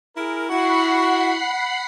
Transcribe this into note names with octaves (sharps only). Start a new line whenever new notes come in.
E4 G#4 A#4
E4 F#4 F#5 B5 C7